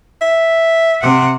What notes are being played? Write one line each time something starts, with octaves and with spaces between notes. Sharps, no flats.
E5
C3 F#5